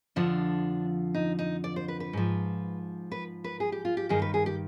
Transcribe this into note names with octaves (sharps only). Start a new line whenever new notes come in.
F2 D3 F3 D4
D#4
D#4
D5
C5
B4
B4
G#2 F3
B4
B4
G#4
G4
F4
G4
G2 D#3 G#4
B4
G#4
G4